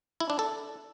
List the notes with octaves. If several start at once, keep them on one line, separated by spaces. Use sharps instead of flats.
E4
D4
A4